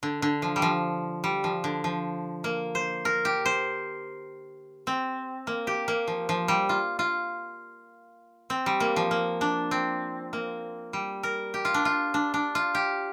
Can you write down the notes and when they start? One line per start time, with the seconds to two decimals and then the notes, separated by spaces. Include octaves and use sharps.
0.03 D3
0.22 D3
0.42 F3
0.56 G3
0.62 F3
1.24 G3
1.44 F3
1.64 D3
1.84 F3
2.44 A#3
2.75 C5
3.05 A#4
3.25 G4
3.45 C5
4.87 C4
5.47 A#3
5.67 G4
5.88 A#3
6.08 F3
6.29 F3
6.48 G3
6.69 F4
6.99 F4
8.50 C4
8.66 G3
8.80 A#3
8.96 F3
9.11 A#3
9.41 D4
9.71 C4
10.33 A#3
10.93 G3
11.23 A#4
11.54 G4
11.65 F4
11.74 D4
11.85 F4
12.14 D4
12.34 D4
12.55 F4
12.75 G4